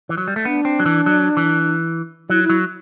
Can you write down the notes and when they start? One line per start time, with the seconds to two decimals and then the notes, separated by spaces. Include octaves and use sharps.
0.09 E3
0.18 F#3
0.28 G3
0.36 A3
0.45 B3 D4
0.65 C4
0.80 F#3
0.86 E3
1.06 F#3
1.37 E3
2.30 F#3 E4
2.44 E4
2.50 F#3